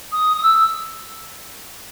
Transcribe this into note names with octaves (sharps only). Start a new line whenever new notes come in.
D#6
D#6
E6